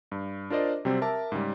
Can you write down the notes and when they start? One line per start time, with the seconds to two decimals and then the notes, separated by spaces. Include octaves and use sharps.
0.12 G2
0.50 D4 F4 A#4 C5 D5 D#5
0.85 C3 F#3 G3 C4
1.02 A#4 E5 A5 D6
1.32 G#2 C#3 G3